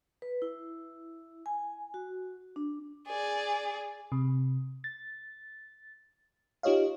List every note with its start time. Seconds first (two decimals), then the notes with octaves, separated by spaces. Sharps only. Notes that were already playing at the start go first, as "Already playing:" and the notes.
0.22 B4
0.42 E4
1.46 G#5
1.94 F#4
2.56 D4
3.07 G#4 D5
4.12 C3
4.84 A6
6.63 D#4 F4 G4 C#5 D#5 F5